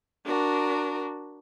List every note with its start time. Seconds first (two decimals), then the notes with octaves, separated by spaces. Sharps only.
0.24 D4 F#4 A#4